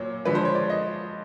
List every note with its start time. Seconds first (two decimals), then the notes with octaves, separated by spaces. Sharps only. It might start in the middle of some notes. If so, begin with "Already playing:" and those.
Already playing: A#2 F#3 C#5
0.25 D3 F3 G#3 B4
0.35 C5
0.45 C#5
0.55 D5
0.70 D#5